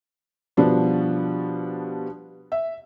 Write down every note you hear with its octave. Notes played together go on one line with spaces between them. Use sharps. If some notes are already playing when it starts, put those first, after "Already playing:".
B2 F3 G3 B3 D4 F#4
E5